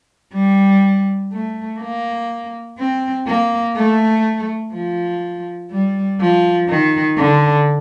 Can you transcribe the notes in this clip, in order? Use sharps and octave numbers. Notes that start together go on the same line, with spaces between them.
G3
A3
A#3
C4
A#3
A3
F3
G3
F3
D#3
D3